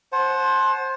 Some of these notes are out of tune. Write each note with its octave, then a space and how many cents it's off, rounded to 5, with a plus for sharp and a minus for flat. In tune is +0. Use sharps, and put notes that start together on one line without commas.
C5 +20 F#5 +0 A5 -30